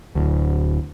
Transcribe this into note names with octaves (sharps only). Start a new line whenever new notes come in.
D1 D2